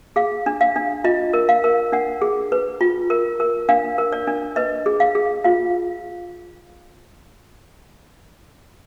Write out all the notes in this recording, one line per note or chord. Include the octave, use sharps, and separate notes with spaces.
G#4 F5
D4
F5
D4
F4 D#5
A#4
F5
A#4
D4 F#5
G#4
B4
F4
A#4
A#4
D4 F5
A#4
D5
D4
B4 D#5
G#4
F5
G#4
F4 F5